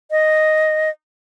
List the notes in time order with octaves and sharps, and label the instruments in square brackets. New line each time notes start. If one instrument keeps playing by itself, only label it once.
[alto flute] D#5